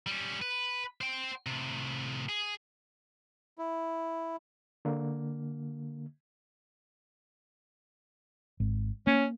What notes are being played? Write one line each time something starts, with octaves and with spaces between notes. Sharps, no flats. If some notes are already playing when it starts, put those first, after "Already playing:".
G3 C#4
B4
C5 G5
A2 C3
G#4
E4
D3 A#3
G#1
A#3 C#4